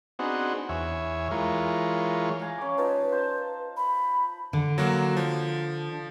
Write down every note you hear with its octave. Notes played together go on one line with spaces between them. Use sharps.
B3 C4 D4 D#4 F#4 G#4
E2 C#5 E5 G#5
E3 G#3 F4 A#4 C#5
F5 G#5 A#5
C#4 D6
D#4 F4 B4 A5
C5 A5
B5
D3
F#3 A#3 F#4
F3